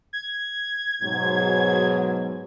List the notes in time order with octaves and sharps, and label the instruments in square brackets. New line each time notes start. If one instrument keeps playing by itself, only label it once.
[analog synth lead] G#6
[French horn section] G#2 B2 F#3